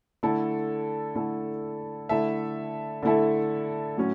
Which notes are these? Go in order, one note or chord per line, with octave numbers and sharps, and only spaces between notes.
D3 A3 E4 A4
D3 A3 E4 A4
D3 A3 E4 A4 E5
D3 A3 E4 A4 E5
A2 F#3 C#4